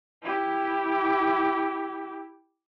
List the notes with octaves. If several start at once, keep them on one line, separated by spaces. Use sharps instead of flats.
E4 G4